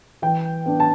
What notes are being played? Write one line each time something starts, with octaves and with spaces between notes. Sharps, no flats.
E3 G5
B3 D4
A5